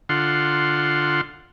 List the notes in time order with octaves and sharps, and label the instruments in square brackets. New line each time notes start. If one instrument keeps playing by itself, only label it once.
[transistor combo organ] D3 F4 F#5 C6